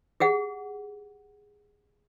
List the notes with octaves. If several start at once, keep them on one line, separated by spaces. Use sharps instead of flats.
G4 G#4 F#5